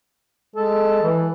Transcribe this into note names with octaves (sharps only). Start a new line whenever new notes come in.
G#3 A4
E3